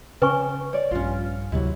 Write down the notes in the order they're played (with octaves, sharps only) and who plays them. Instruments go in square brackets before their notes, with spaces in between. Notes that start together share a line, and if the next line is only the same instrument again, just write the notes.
[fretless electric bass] C#3 [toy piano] B4 G#5 C#6
[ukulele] C#5 D5
[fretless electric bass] A#1 G2 [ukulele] C#4 F4
[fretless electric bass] D2 C3 F#3 [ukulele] E4